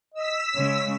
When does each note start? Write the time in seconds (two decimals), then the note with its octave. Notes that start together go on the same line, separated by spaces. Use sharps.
0.14 D#5 E6 B6
0.55 C#3 G#3 C#5